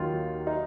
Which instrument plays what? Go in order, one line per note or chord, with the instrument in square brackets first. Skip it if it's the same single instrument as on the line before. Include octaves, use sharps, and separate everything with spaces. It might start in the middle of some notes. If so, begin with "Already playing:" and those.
Already playing: [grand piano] D#2 D#3 F#3 F4
D#4